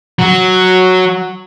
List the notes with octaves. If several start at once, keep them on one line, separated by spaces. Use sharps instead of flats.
F#3